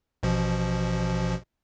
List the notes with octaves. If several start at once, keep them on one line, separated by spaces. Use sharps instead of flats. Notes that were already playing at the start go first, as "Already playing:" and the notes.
A1 B2 F3